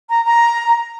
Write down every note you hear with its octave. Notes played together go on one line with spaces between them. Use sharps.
A#5
A#5